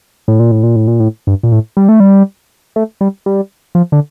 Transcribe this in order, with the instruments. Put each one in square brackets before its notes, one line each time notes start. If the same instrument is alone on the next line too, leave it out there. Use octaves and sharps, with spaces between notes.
[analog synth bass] A2
A#2
A2
A#2
A2
A#2
A2
G2
A#2
A2
G3
A3
G3
A3
G3
G3
F3
D3